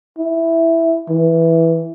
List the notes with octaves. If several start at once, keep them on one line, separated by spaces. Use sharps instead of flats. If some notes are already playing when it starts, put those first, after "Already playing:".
E4
E3